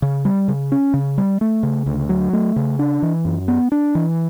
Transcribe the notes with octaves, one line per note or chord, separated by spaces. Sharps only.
C#3
G3
C#3
C#4
C#3
G3
A3
C#3
D2
F#3
A3
C#3
D4
E3
F#2
B3
D4
E3